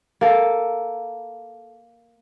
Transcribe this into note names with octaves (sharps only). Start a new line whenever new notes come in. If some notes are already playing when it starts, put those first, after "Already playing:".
A#3 A4